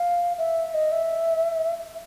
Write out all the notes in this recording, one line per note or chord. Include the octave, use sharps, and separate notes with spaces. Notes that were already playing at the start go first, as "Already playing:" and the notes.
Already playing: F5
E5
D#5
E5